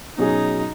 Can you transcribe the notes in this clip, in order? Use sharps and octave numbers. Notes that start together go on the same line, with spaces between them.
B2 F#3 C#4 D#4 G#4